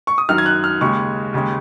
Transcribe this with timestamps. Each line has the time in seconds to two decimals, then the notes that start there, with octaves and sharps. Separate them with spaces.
0.07 C#6
0.18 D#6
0.29 F#2 D#3 F#3 F6
0.38 G#6
0.46 F#6
0.64 F6
0.81 D#2 C#3 G#3 C#6
1.34 D#2 C#3 G#3